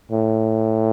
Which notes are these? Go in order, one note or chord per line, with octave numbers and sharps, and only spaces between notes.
A2